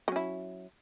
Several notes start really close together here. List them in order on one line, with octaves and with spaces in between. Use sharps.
F#3 C#4 E4